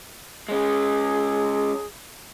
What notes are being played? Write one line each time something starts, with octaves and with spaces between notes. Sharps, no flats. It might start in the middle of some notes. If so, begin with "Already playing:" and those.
G#3 C#4 G#4